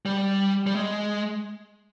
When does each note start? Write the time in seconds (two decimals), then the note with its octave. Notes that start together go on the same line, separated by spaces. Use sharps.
0.05 G3
0.67 G3
0.75 G#3